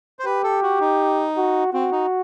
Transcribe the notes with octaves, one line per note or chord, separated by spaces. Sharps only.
C5
G4 B4
A4
F#4
D#4
F#4
C4 F#4
D#4